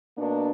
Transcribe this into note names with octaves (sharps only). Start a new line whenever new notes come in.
B2 A#3 D4